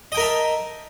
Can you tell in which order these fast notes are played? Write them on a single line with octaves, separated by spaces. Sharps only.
D#5 G5 A#4 E5 A5